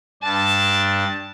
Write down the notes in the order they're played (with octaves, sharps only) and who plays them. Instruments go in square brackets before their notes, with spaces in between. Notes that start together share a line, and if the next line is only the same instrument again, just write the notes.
[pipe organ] G2 D4 A6 [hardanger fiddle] A5